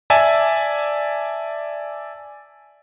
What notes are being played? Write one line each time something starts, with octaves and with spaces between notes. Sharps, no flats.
D5 E5 G#5 A5